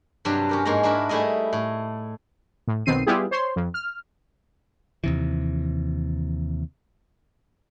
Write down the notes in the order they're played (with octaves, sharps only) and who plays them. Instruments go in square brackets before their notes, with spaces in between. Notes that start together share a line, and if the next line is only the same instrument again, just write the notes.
[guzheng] G2 C3 F#3 G3 D4
C#4 G4 A#4
G#2 G#3 A#3 C#4 A#5
D4 E4 F#4 A#4 B4
G3 A3 E4 G#4 D#5
A2
[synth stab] A2
B1 B2 D#3 C4 C7 D#7
G3 B3 E4 F4 G4 G#4
C5 C#5 C6
F2
F6
[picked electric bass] D#2 C3 E3